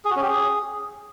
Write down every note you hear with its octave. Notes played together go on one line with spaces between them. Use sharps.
G#4
F#4
C#4
G4
G#4